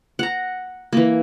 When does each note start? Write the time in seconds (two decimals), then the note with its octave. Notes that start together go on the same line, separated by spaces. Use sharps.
0.19 F#5 A#5
0.93 E3 A#3